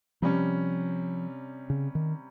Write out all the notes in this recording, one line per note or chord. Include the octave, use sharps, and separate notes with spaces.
C3 F3 G3 C#4
C#3
D#3